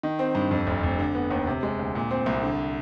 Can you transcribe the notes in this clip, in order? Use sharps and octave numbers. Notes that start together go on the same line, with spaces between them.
D#3
C4
G2
F2
F1
F1
D3
B3
D#2
C3
G#3
D2
A#2
C4
C2
D3